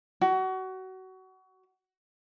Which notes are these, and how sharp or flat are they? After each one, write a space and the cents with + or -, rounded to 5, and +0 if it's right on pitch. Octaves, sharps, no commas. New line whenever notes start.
F#4 +25